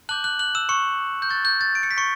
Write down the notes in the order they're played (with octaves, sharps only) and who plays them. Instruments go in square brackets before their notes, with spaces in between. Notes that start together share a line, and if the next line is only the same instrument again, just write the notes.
[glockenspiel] A5 D6 F#6 G6 F#7
F#6 F#7
F#6 F#7
E6 E7
C#6 C#7
G6
C#6 F#6 A6
G6
A6
D7
C#7
B6
C#6 C#7